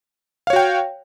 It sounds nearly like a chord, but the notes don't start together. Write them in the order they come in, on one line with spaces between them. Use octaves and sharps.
F5 C#5 F#4 G5